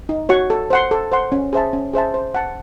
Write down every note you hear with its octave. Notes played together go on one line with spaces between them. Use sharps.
D#4
F#4 C#5 F#5 C#6
A4
C5 F#5 C6
A4
C5 F#5 C6
C#4
G#4 C5 E5 A5
C#4
G#4 C5 E5 A5
C5
F#5 A5